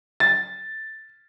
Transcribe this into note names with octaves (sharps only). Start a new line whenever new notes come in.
A6